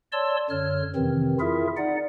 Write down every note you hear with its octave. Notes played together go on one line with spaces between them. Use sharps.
C#5 D5 A5 C6 E6
F#2 D3 C#5 F6
F2 C3 D#3 E3 C4
E4 F4 G#4 A#4 E5
D#4 D5 F#5